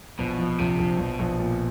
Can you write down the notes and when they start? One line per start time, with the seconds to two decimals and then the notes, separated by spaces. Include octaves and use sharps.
0.19 A#1 B2
0.39 F3
0.58 A#1 C3
0.78 A#1
0.98 A#1 B2
1.19 A#1
1.40 A#2